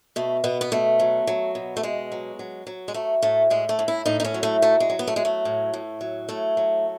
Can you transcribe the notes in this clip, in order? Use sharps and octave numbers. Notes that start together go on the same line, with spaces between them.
B2 A3
B2 B3
B3
B2 A3
F#3
F#3
B2
A3
B2 G#3
F#3
F#3
F#3
G#3
F#3 A3
A2 A3
A2 G#3
A3
A2
E4
A2 D#4
D#4
C#4
F#3
A3
F#3 A3
G#3
F#3
B3
A3
F#3 G#3
A3
A2
A2
F#3
A2 A3
F#3